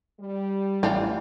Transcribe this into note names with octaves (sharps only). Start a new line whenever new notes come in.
G3
A1 C4 D4 F4